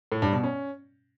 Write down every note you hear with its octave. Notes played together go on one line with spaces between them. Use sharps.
A2
G2
B2
C#4